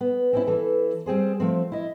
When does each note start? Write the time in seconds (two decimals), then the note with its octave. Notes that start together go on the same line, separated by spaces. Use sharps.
0.01 B3
0.33 C4 C#4 E4
0.47 E3 A4
1.06 G3 C4 G#4 C5
1.40 F3 A3 C4
1.72 E4 D#5